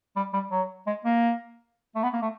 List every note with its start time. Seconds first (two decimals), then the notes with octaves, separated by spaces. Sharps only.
0.16 G3
0.33 G3
0.51 F#3
0.87 G#3
1.05 A#3
1.95 A3
2.03 B3
2.13 A#3
2.22 A3